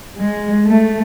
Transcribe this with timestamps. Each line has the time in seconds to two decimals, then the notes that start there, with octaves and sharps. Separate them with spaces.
0.15 G#3
0.66 A3